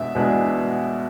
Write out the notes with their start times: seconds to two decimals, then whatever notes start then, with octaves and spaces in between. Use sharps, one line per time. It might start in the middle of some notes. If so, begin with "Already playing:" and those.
Already playing: E2 B2 G#3 B3 D4 E5
0.15 E2 B2 G#3 B3 D4